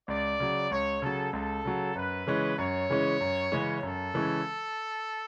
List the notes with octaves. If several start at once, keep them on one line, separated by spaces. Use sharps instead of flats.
C#2 D5
C#3 F#3
C#2 C#5
C#3 F#3 A4
C#2 A4
C#3 F#3
F#2 B4
C#3 E3 G#3 C#4
F#2 C#5
C#3 E3 G#3 C#4
F#2
C#3 E3 G#3 C#4
F#2 A4
C#3 E3 G#3 C#4